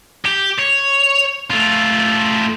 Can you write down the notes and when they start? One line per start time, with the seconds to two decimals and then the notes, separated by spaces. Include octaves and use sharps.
0.25 G4
0.58 C#5
1.50 A3 F4